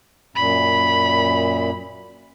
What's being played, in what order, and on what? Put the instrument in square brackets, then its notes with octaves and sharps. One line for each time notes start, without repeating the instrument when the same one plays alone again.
[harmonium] F#2 A#2 [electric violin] B5